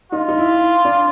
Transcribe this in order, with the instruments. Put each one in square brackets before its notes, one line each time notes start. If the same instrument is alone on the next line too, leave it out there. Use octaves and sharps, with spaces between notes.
[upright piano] D#4 [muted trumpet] F4
[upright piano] D#4
E4
D4